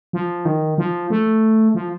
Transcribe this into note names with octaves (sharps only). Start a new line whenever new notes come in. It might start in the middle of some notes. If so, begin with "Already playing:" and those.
F3
D#3
F3
A3
F3